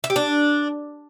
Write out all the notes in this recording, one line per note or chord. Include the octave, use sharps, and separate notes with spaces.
E5
G4
D4